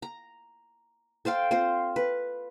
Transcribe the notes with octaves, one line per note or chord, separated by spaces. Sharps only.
A#5
A4 C5 F5 G5
C4 F4 C5
B4